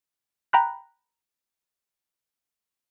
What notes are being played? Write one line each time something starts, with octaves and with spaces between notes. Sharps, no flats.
G5 A#5 B5 F#6